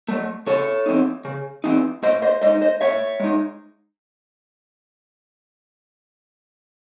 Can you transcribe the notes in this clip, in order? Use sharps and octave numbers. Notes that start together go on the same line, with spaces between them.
F#3 A3
C#3 A4 C#5
E3 C4 D#4
C#3
E3 C4 D#4
A2 C5 D#5
C5 D#5
G#3 D#4 C5 D#5
C5 D#5
A2 C#5 E5
G#3 D#4